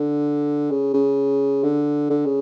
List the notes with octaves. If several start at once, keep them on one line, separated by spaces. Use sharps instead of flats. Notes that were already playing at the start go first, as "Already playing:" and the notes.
Already playing: D3
C#3
C#3
D3
D3
C#3